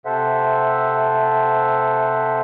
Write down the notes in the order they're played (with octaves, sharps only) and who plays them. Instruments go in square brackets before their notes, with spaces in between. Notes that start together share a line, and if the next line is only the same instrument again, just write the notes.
[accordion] C3 A4 C5 E5 F#5